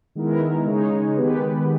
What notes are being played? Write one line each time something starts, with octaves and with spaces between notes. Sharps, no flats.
D#3 G#3 B3 E4 A#4
C#3 G#3 D#4 G#4 C#5
D#3 G#3 B3 G4 B4